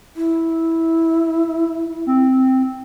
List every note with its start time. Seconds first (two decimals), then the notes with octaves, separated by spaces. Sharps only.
0.16 E4
2.06 C4